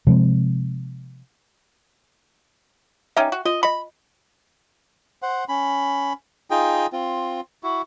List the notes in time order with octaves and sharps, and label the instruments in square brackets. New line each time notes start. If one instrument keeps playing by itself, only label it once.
[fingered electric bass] C3 F3 G#3 C4
[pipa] C#4 D#4 G4 [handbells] E5 G5
[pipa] F#4
[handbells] F4 [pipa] D#5
[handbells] D#5 C#7 [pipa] B5
[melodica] C5 F#5
C#4 B5
D#4 F4 G#4 G5
C4 F4
E4 F#4